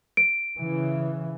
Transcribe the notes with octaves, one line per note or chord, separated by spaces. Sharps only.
D7
C#3 E3